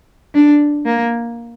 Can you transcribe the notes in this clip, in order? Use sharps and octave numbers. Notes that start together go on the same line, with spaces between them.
D4
A#3